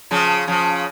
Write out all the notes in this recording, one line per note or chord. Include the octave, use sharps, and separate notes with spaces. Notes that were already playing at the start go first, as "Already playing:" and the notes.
C#3 F3
C#3 F3